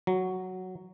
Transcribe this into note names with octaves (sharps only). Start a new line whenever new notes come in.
F#3